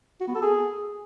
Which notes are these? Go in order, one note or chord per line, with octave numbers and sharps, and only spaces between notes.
F#4
B3
A4
G#4